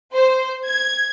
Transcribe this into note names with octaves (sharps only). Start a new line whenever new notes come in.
C5
G#6